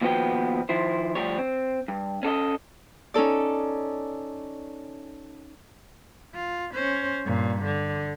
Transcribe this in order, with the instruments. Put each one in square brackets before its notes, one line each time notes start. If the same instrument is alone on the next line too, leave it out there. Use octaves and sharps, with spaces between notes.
[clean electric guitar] D#2 B2 F3 B3 F#4 G5
D#3 F3 E4 C5
D2 B2 F3 G3 C#5
C4
G2
C#4 A4 D5 D#5
[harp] C#4 D#4 A4 D5
[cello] F4
C#4 C5
G2 A#2
D3